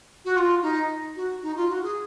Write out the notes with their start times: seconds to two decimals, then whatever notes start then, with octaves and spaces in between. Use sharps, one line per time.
0.25 F#4
0.36 F4
0.62 D#4
1.16 F#4
1.42 D#4
1.56 F4
1.69 F#4
1.83 G#4